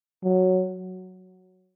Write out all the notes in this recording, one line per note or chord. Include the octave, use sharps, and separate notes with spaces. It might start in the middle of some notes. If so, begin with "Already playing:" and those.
F#3